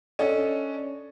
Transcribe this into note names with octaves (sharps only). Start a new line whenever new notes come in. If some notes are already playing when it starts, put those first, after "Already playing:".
C#4 D4 A4 D#5